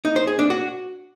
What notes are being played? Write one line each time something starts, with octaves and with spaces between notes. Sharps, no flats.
D#4
C5
G#4
D4
F#4